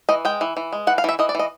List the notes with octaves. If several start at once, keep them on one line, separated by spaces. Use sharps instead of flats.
E3 D#5
G#3 G5
E3
E3
G#3
E3 F#5
F5
E3 E5
E3 D#5
D5
E3 D#5